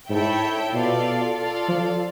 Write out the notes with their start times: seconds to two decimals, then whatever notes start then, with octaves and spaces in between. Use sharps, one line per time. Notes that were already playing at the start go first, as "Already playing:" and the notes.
0.09 G#2 E4 A4 C#5 E5 G5
0.73 B2 F4 A4 D5 F5
1.36 F4 A4 D5 F5
1.69 F3